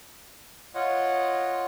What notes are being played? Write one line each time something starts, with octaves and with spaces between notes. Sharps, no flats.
F4 C#5 D#5 F#5